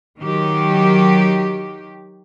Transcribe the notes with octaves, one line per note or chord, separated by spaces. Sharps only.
D#3 F#3 G4